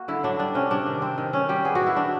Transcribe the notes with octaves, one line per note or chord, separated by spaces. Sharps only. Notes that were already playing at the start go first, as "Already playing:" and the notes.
Already playing: A#3 F#4
D3 E4
F#3 D4
G3 D4
C3 C#4
C3 D4
D#3
C4
D#3
D#3 C#4
G3 G4
B3 G#4
F#4
D#3
E4
D#3 D4